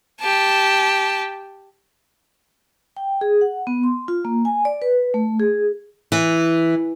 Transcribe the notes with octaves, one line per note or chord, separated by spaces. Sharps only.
G4 A5
G5
G#4
F#5
B3
C6
F4
A#3
G#5
D5
B4
A3
G#4
E3